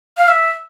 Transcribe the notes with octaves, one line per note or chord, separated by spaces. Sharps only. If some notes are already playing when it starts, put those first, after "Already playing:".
F5
E5